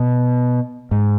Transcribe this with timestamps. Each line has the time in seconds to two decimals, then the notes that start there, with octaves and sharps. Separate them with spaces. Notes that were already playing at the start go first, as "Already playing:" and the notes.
Already playing: B2
0.91 G#2